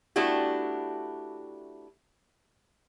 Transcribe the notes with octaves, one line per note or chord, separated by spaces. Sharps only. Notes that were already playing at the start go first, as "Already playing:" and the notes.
A3 B3 D4 E4 F#4 G4